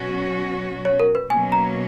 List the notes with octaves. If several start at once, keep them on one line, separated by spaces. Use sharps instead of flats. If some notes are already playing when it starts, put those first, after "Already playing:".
Already playing: B2 F#3 C#4 F#4
C#5
A#4
B4
B2 F#3 A#3 C#4 G#5
A#5